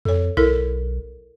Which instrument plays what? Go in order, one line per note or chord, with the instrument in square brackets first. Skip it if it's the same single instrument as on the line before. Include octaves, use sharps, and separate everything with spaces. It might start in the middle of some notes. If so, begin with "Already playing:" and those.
[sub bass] F2 [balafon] A4 C#5
[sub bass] B1 [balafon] E4 A4 A#4